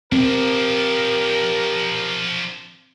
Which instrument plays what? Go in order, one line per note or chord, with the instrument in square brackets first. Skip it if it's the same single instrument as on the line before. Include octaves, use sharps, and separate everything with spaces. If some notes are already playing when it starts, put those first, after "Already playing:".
[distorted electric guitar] F3 D4 [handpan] C4 [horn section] G4 A#4